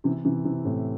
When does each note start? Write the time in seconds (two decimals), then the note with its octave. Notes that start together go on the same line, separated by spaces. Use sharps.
0.04 C3 E3
0.25 C3 E3
0.44 C3 E3
0.65 A2 C3